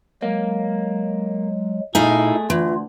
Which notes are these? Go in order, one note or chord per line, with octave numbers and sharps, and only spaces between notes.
F#3 G#3 A#3
A#2 A3 D#4 E4 G#4 F5
D2 E3 F4